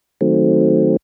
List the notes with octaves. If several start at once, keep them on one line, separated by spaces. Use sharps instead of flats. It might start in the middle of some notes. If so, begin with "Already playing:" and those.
D#3 F#3 A3 C4